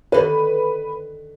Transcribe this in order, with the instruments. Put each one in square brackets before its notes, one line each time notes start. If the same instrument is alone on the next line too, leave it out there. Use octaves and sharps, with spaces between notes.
[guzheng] D3 D#3 [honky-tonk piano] B4